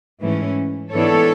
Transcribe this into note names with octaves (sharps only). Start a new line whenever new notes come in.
G#2 E3 A3 C#4
G#2 E3 B3 D4 A4 C#5